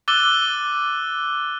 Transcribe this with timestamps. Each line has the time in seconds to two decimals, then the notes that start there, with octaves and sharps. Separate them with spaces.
0.08 D6 E6 F#6 A6 D#7 G7